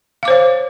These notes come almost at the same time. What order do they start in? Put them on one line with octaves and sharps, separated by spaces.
F5 D6 C5 C#5